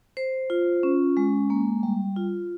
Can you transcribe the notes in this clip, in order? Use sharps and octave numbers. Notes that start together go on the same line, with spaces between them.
C5
F4
C#4
G#3
A#3
G3
F4